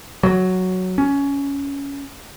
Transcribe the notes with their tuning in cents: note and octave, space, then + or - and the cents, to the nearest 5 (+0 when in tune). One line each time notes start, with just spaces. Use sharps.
F#3 +0
C#4 +15